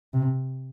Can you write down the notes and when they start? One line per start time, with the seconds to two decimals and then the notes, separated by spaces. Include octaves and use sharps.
0.13 C3